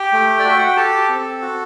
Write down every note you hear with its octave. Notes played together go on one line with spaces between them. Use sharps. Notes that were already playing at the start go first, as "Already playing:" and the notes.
Already playing: G4 G5
A3
D5
F#4 E5
F#5
G5
G4 A4 A5
C4
F#4